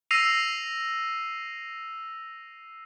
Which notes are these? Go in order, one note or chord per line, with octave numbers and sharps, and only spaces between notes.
E6 A#6 C7 D#7 F7